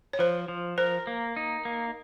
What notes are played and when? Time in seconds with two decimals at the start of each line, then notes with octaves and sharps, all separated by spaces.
0.13 C#5
0.19 F3 C5
0.48 F3
0.78 A#4 C5
1.07 A#3
1.36 D#4
1.65 A#3